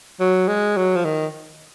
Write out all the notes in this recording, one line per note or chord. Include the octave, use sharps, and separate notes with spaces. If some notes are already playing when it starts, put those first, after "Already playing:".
F#3
G#3
F#3
F3
D#3